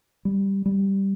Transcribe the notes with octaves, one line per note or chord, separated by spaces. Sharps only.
G3
G3